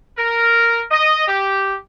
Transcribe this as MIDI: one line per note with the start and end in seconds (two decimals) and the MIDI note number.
0.17 0.80 70
0.91 1.26 75
1.27 1.74 67